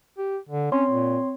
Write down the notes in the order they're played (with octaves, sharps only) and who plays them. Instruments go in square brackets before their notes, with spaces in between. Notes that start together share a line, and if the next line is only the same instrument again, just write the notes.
[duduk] G4
D3
[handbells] C4 C#5 C6 [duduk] C#4
[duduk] A#2